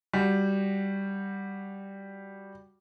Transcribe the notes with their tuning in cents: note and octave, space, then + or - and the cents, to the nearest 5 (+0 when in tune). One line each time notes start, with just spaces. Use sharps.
G3 +0 F#4 +0